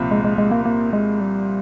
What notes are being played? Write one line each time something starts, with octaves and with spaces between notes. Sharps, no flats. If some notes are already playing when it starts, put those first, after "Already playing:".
Already playing: C2 A#2 F3 C4 F4
G#3
G#3
G#3
A#3
A#3
G#3
G3